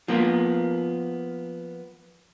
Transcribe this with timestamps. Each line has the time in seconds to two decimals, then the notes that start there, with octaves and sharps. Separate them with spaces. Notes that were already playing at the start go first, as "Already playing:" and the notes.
0.08 F3 A#3 B3 A#4